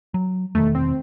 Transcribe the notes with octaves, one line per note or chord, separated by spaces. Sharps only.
F#3
E1 D#3 A3
C4